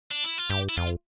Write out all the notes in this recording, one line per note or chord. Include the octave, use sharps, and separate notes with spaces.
D4
E4
F4
G2 G4
E4
F2 F4